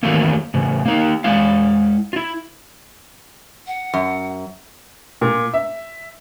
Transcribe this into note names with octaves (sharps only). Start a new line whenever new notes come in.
D#3 E3 F#3 A3 A#3
A2 C#3
A#3 D#4
G#3 E4 F5
E4 F4
F#5
F#2
A#2
E5